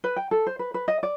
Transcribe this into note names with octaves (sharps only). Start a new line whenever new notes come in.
B4
G5
A4
C5
B4
B4
D#5
D5